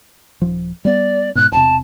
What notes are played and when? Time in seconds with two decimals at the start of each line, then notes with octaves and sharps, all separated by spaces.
0.41 D#1 F3
0.85 G3 B3 D5
1.35 G#2 B2 F#6
1.52 E1 C3 A5